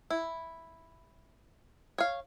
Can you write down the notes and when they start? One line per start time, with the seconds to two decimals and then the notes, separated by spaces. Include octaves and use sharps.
0.10 E4
1.98 C#5 F5